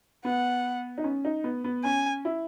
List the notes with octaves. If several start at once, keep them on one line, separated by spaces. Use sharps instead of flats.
B3 F#5
D#4
C#4
D#4
B3
B3
C#4 G#5
E4